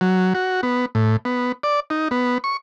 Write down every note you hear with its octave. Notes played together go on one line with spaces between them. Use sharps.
F#3
F#4
B3
A2
B3
D5
D#4
B3
C#6